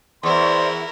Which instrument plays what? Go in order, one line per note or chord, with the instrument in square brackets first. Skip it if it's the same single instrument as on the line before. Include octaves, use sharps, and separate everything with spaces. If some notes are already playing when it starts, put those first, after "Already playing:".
[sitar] E2 [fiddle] E4 A#4 [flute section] C5 D5 [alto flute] C6